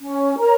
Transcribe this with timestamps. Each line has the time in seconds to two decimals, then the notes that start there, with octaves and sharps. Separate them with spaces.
0.01 C#4
0.38 A#4 C#5 A#5